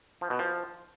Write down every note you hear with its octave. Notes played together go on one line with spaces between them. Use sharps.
F3
B2
F3